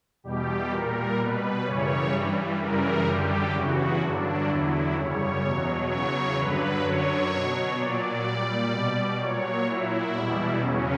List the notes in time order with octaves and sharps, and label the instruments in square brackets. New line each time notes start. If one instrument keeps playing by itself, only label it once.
[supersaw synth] E2 B2 G3 G4
A#2 G3 A#4
B2 G3 B4
F#2 C#3 E3 G3 C#5
G2 E3 G3
F#2 C#3 E3 G3 A#4
F#2 D3 G3 G4
E2 C#3 E3 F#4
G2 D3 F#3 D4
E2 D3 F#3 E4
F#2 C#3 G3 C#5
E2 B2 F#3
E2 C#3 F#3 C#5
G2 D3 F#3 B4
F#2 D3 F#3 C#5
B2 F#3
A#2 F#3 D5
A#2 G3 D5
B2 G3
A#2 F#3 C#5
A#2 F#3 E4
E2 B2 G3
E2 C#3 F#3 C#4